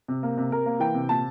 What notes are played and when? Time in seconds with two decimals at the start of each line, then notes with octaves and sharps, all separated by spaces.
0.08 C3
0.23 A#3
0.38 C3
0.52 C3 A#4
0.66 A#3
0.80 E3 G5
0.94 C3
1.09 A#2 A5